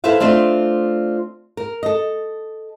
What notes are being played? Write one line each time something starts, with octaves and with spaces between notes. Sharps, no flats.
E4 A4 B4 C5 E5 F5
A3 C4 D4 F4
A#4
A4 D#5